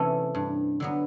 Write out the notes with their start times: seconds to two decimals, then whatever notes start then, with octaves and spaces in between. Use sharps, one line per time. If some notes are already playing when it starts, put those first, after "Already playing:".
Already playing: C3 E3 A3 C#4
0.35 G2
0.80 D3 F#3 B3